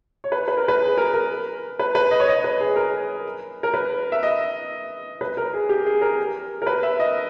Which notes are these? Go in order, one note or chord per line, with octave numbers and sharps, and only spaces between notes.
C#5
B4
B4
A#4
B4
G#4
A#4
A#4
B4
B4
D#5
C#5
D#5
B4
G#4
A#4
A#4
B4
E5
D#5
B4
A#4
G#4
G4
G#4
A#4
A#4
B4
E5
D#5